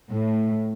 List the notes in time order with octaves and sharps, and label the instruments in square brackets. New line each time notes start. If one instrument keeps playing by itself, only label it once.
[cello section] A2